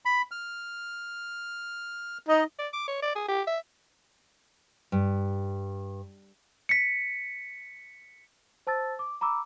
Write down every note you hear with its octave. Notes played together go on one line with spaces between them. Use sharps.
B5
F6
D#4 D#5
D5
D6
C#5
D5
G#4
G4
E5
G2
B6 C#7
C5 A5 E6 A6
D6
A#5 B5 D6 E6